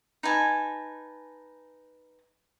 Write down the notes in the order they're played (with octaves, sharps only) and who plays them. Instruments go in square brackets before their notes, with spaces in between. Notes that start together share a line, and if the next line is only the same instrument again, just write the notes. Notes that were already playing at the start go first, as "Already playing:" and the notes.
[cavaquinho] D#4 B4 G#5 A5